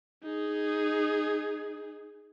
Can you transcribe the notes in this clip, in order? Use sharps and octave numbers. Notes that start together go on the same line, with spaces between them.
D#4 G#4